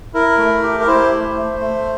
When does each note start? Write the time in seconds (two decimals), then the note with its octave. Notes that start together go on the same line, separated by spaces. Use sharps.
0.14 E4 A#4
0.38 A3
0.63 G4
0.80 A#4
0.87 E4 C5
1.12 A3
1.36 A3
1.60 A3